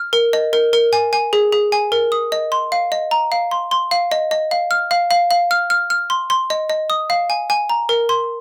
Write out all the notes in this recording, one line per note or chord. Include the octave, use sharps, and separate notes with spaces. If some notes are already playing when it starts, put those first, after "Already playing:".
Already playing: F6
A#4
D#5
A#4
A#4
G#5
G#5
G#4
G#4
G#5
A#4
D#6
D#5
C6
F5
D#5
A#5
F5
C6
C6
F5
D#5
D#5
F5
F6
F5
F5
F5
F6
F6
F6
C6
C6
D#5
D#5
D#6
F5
G#5
G#5
A#5
A#4
C6